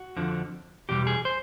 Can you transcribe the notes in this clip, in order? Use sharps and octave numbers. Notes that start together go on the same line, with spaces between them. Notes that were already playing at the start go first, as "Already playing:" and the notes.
Already playing: F#4
F2 D3 F3
E2 B2 G3 G4
G#4
C5